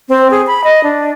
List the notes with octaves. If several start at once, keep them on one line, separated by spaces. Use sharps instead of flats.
C4
G#4
B5
D#5
D4